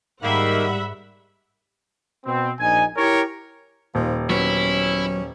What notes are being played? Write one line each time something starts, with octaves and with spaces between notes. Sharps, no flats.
G#2 D#3 G3 A#3 E5 F#5 B5
B2 C4
A#1 D#4 G#5
E4 G4 A#4 C#5
D#1 F3
F#3 B3 C#4 E4